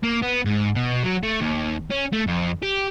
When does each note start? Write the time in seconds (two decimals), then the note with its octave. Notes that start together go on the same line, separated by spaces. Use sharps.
0.03 A#3
0.22 B3
0.45 G#2
0.76 B2
1.04 F#3
1.23 A3
1.41 D#2
1.90 C#4
2.13 A3
2.27 F2
2.63 G4